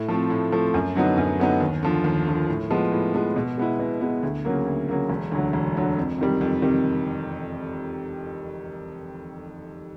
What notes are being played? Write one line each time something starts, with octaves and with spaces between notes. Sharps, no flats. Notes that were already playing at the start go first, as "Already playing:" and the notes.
Already playing: A2
F3 A3 C4
A2
F3 A3 C4
F#2
D3 F#3 B3 D#4
F#2
D3 F#3 B3 D#4
D#2
D3 F3
D#2
D3 F3
A2
F3 G#3 B3
A2
F3 G#3 B3
B2
G#3 B3 E4
B2
G#3 B3 E4
D2
C#3 F#3 A#3
D2
C#3 F#3 A#3
E1
D2 D3 F#3
E1
D2 D3 F#3
F2
C3 D#3 G3
F2
C3 D#3 G3